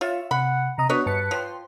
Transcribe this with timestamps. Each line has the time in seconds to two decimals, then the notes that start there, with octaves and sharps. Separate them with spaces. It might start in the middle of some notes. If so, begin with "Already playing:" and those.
0.01 F4 C#5 E5 F5
0.31 C3 F#5 B5
0.78 C3 D#5 A#5 D#6
0.89 B2 B3 D4 F#4 B4 C#5 D#5
1.06 G2 B4 A5 C#7
1.31 F3 C#5 G5 C6